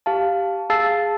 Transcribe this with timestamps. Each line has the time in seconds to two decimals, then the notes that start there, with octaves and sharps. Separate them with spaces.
0.06 G4 F5 A5
0.70 G#4 F5 A5 E6 A6 C7